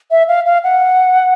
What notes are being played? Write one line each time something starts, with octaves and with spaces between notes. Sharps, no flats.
E5
F5
F5
F#5